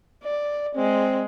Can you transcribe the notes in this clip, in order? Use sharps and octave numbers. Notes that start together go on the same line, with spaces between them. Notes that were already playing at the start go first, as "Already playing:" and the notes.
D5
G#3 C4